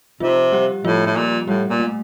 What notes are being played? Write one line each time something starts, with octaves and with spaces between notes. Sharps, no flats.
C3 F3 F4
G3 G4
A2 F3 F4
A2
A#2
A2 G3 G4
A#2
A3